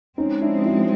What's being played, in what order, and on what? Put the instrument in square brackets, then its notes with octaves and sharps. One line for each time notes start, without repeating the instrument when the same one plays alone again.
[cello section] F3 G#3 C4 [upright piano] C#4 D#4
[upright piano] D4 E4
E4 F#4